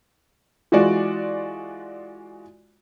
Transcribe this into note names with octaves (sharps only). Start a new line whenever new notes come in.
E3 G#3 F4 F#4 D5